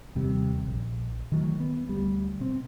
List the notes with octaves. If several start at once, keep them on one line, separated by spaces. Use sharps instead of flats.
D#2 C3 G3
D#1 A#1
D#3 E3 F#3 A3
B3
D2 G3
B2 C4